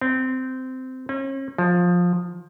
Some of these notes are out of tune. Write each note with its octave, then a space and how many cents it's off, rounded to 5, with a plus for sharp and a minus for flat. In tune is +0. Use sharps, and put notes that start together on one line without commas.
C4 -15
C#4 -40
F3 +15